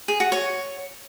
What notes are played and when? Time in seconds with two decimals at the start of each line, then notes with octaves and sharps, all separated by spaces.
0.08 G#4
0.20 F#4
0.32 C#5